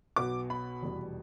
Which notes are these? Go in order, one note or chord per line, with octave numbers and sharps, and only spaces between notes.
B1 B2 B3 D6
B5
F1 E2 B2 G3 B3